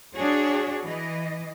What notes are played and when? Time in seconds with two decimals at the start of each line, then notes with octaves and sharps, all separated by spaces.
0.14 D4 F#4 G#4 C#5
0.84 E3 D#5